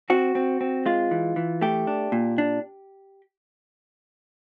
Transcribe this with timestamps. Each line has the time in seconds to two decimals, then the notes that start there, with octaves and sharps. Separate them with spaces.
0.10 C4 F#4
0.35 C4
0.61 C4
0.86 G#3 F4
1.11 E3
1.36 E3
1.61 A3 G4
1.87 D4
2.12 A#2
2.38 D4